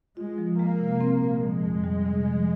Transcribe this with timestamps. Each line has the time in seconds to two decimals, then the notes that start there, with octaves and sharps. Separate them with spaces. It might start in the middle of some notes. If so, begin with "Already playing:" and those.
0.17 G#3 F4
0.38 F3
0.59 G#3 A#3
0.80 C3
1.01 C4
1.21 A#2
1.42 F3 G#3
1.63 F2
1.84 G3
2.05 C3
2.26 F3